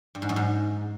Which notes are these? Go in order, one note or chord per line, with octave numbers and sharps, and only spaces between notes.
G2
G#2
F#2
G#2